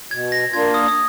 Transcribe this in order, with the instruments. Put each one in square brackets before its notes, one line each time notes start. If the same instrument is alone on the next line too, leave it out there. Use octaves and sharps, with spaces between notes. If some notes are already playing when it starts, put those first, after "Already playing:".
[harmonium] B2 [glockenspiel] G#6
[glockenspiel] A#6
[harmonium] A#3 D4 F4 [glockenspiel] G#6
[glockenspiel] D#6
D#6